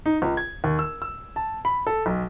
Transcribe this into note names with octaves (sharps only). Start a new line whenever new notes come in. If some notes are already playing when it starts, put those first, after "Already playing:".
D#4
C#2
G#6
D#2
E6
E6
A5
B5
A4
B1